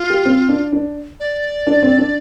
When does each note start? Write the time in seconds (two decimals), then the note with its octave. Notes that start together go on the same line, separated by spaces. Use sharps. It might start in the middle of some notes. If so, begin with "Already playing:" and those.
Already playing: F4
0.10 G4
0.25 C4
0.49 D4
0.72 D4
1.20 D5
1.67 D4
1.83 C4
1.98 D4